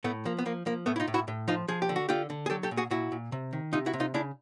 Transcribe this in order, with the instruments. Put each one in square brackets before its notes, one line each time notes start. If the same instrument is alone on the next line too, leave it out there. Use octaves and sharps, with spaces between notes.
[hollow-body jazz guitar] A2 A3 B3
F3 A#3
B3
F3 A#3
F3 A#3
A2 A3 B3
E4
D#4 F4
A2
E4 F#4
A2
F3 D#4 F4
F3 G#4
G4
D3
F#4
D3 F4 G4
D3
G#4
F#3 G4 A4
G4 A4
A#2
F#4 G#4
A#2 E4 F#4
A#2
C3
D#3
C3 D#4 F4
E4 F#4
C3
D#4 F4
C#3 D4 E4